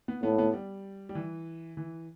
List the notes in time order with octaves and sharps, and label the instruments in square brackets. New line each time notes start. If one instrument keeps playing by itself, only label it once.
[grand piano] B3
[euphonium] A2 [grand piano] B3
[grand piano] B3
G3
G3
E3
E3